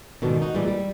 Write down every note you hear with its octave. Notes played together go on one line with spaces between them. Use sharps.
F2 G#2 B2 D3 D#3
D#4 F#4
A#2 E3 G3 G#3
G3